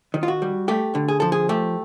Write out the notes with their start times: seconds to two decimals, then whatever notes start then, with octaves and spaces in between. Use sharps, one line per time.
0.14 D#3
0.23 F4
0.28 F#4
0.42 G3
0.68 A3 G4
0.95 D3
1.08 G#4
1.20 F3 A4
1.32 G#4
1.49 A3 G4